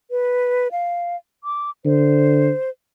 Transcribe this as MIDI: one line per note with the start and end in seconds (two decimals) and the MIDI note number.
0.11 0.68 71
0.72 1.16 77
1.44 1.70 86
1.85 2.51 50
1.85 2.70 72